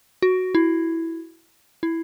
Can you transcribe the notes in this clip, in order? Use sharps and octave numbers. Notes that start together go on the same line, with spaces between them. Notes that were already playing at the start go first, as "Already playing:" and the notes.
F#4
E4
E4